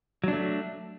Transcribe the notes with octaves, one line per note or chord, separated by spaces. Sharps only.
F#3 A3 D4